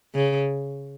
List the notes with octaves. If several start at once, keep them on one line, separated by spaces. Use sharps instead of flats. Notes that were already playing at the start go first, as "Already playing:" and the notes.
C#3